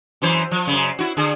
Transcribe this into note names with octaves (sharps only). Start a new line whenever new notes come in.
F#2 E3 C5
F3
F#2 C#3
E4 F#4
D3 G#4